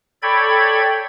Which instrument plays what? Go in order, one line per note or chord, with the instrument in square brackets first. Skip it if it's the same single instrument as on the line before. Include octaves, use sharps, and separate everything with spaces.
[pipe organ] A4 C#5 D5 G5 B5 G#6